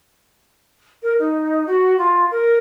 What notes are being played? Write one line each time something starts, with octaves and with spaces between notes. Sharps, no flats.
A#4
D#4
F#4
F4
A#4